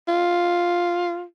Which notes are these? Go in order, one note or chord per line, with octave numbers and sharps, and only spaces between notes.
F4